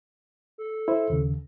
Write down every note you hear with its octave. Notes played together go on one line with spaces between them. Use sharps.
A4
E4 C5
D#2 C#3